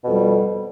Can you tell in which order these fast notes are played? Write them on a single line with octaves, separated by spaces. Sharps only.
B2 F2 G3